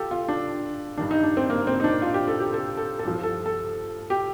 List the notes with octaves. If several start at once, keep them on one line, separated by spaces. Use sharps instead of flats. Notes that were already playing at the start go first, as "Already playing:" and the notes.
Already playing: F4 G4 A4
F4
D4
G2 D#3 D4
D#4
D4
C4
A#3
C4
D#4
D4
F4
G4
A4
G4
A4
A4
A4
G2 F3
A4
A4
G4